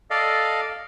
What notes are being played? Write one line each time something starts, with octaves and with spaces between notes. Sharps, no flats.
A4 D5 D#5 F5